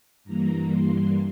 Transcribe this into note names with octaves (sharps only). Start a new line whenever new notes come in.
G2 E3 G3 A#3 A#5
C6